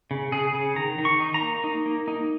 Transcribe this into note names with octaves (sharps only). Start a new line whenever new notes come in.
C#3
C#3 G#4
C#3
D#3 A#5
D#3
C#6
D#4
A#5
A#3
D#4
A#3
D#4